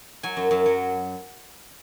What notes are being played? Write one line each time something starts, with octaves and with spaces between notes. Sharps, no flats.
F#3 G#5
F#2
F#2
F#3